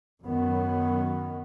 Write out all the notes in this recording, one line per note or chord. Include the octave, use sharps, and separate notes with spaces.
F#2 D#3 F#3 B3